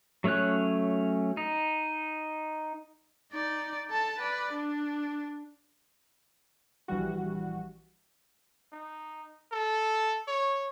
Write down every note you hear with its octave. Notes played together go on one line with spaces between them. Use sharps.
F#3 A3 C#4 C#5 F#6
D#4
D#4 D5
A4 A5
B4 D5
D4
A#1 E3 G3 F#4
D#4
A4
C#5